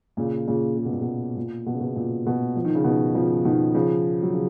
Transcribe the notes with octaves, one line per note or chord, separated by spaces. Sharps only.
A#2 C#3
A#2 C#3
C#3
B2
A#2
B2
A#2
B2
C#3
B2
A#2
B2
F3
D#3
C#3
B2 D#3
C#3 F3
B2 D#3
C#3 F3
F#3
C#3